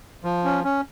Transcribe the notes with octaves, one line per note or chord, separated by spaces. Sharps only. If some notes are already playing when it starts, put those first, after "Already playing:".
F3
C#4
C#4